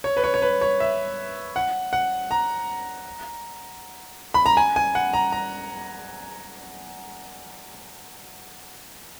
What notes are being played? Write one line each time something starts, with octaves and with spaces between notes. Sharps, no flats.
C#5
B4
C#5
C#5
B4
C#5
E5
F#5
F#5
A#5
B5
A#5
G#5
G#5
F#5
A#5
A#5